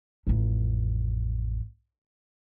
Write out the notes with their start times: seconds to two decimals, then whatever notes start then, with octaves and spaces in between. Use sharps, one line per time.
0.27 A1 F2